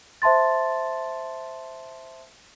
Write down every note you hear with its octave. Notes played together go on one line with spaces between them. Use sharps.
C5 E5 A5 C6 A6